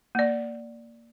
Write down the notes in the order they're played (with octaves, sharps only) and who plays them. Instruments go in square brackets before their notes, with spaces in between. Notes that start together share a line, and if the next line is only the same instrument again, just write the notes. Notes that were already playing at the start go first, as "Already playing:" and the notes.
[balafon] A#3 D5